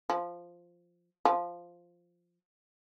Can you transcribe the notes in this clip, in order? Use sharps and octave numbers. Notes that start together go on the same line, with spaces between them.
F3
F3